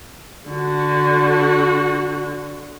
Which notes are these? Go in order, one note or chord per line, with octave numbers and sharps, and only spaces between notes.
D3 F#4